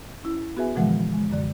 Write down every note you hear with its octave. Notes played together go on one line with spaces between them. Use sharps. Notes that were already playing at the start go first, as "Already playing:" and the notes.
C#4 E4
B3 F#4 G#4 B4 E5 G#5
A#2 D3 E3 F3 G#3 F#5
G#3
F#2 D3 D5